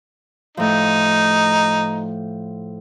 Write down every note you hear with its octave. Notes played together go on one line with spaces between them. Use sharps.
A2 F3 D#4